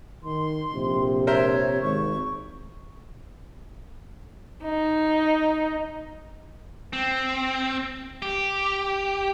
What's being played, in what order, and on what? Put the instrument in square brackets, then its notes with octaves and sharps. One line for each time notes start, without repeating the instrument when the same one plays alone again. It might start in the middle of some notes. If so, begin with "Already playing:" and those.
[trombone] D#3 [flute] C6
[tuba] A#1 [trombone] C3
[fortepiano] A#4 C5 E5 [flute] C#5
[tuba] G#1 [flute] C#6
[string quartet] D#4
[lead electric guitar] C4
G4